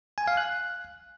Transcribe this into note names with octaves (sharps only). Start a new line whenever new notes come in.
G#5
F5
F#6